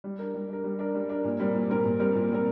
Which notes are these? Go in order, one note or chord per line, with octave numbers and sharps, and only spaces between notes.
G3
D4 A#4
G3
D4 A#4
G3
D4 A#4
G3
D4 A#4
A#2
G3 C4 A#4
A#2
G3 C4 A#4
A#2
G3 C4 A#4
A#2
G3 C4 A#4